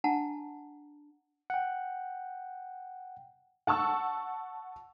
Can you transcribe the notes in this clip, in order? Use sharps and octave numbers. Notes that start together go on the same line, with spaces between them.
D4 F#5 A5 A#5
F#5 G5
F#5 A5 C#6 E6